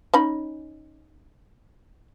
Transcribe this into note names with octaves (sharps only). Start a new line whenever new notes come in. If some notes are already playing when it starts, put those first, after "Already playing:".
C#4 D#4 B5